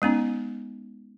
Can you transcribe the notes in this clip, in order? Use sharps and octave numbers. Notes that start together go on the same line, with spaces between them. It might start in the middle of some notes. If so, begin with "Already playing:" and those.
G#3 B3 C#4 D#4